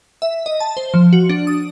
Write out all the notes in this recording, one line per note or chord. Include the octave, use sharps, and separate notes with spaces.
E5
D#5
A5
C5
F3
F#4
D4
D#6